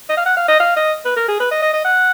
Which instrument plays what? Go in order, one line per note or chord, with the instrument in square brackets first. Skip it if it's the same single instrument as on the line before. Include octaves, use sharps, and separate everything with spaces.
[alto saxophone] D#5
F5
F#5
F5
D#5
F5
D#5
B4
A#4
G#4
B4
D#5
D#5
D#5
F#5